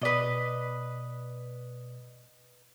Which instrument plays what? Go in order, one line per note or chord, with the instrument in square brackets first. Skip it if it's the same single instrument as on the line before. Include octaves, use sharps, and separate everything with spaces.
[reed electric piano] B2 D5 [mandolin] B4 D#5